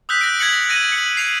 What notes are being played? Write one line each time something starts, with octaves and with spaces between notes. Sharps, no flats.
D#6 E6 F#6 G6 B6
F#6 A#6 D7
G#6 A#6 C#7 F#7
E6 G6 A#6 D7 D#7
C#7 F#7
C7 F7